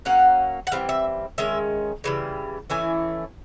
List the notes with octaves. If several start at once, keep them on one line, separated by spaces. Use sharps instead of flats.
F#3 A#3 C#4 F#5
F#5
E3 G3 C4 F5
E5
D#3 G#3 C#4 E5
C#3 E3 G3
E3 A3 C#4 E4 G#5